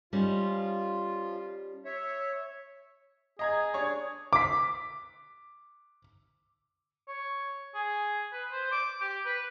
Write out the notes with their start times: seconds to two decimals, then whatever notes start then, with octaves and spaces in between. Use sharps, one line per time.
0.13 F3 G3 C#4 D#4 F4
1.85 C#5 E5
3.39 G#4 D#5 A#5 G#6
3.74 D4 C#5 C#6
4.33 D6 B6
7.08 C#5
7.75 G#4
8.33 B4
8.52 C5
8.72 D6
9.01 G4
9.26 B4